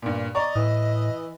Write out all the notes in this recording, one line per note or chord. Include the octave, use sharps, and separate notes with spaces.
G2 A#2
D5 D#5 A#5 C#6
A2 E3 D#6